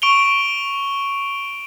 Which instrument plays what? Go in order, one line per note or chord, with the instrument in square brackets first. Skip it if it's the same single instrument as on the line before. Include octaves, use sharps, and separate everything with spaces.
[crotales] C#6 D7 F7 G7